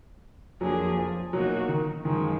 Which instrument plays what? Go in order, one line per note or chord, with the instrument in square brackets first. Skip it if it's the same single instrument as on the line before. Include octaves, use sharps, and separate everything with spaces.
[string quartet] F2 F3 A#3 D4 G#4 [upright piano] F#3
[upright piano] F3
[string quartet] B2 A#3 D#4 F#4 [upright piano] F#3
[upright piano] D#3
[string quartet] F#2 F3 G#3 [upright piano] D#3